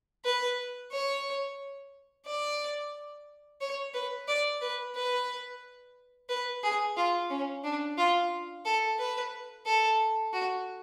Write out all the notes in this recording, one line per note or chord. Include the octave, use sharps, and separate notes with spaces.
B4
C#5
D5
C#5
B4
D5
B4
B4
B4
G#4
F4
C#4
D4
F4
A4
B4
A4
F#4